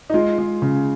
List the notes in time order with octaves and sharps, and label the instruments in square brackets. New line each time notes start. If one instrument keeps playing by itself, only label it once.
[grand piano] D#4
G#3 F4
G#3
C#3